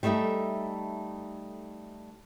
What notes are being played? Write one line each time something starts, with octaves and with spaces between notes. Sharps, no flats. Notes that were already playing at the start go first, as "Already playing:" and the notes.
G3 A3 D#4 A4 E5